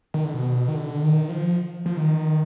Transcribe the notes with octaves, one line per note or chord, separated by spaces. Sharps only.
D#3
D3
B2
D#3
D3
D#3
F3
F3
D#3